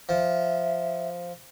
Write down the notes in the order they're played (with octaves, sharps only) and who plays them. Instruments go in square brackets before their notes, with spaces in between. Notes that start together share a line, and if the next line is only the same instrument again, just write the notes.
[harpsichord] F3 [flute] E5